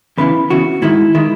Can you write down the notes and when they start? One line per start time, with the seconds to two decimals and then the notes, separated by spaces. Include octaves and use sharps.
0.18 E2 C#3 E3 B4
0.50 E2 C#3 E3 F#4
0.82 G#2 D#3 G#3 E4
1.15 D#3 G#3 E4